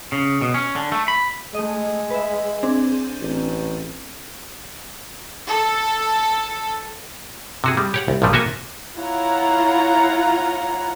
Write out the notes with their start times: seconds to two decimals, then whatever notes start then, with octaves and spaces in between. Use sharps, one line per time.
0.12 C#3
0.42 B2
0.54 C#4
0.76 D3
0.92 A3
1.08 B5
1.55 G#3 A3 D#5
2.10 B4 E5
2.63 C4 D4 G#4
3.21 A1
5.48 A4
7.64 C3 F#4 G#4
7.77 G3 G#3
7.94 G4 C#5 F#5
8.08 C2
8.22 A#1 G2 A#2 F3 G3 A3
8.33 A#3 F#4 A4 E5 G#5
8.95 E4 F4 C#5 F#5 A#5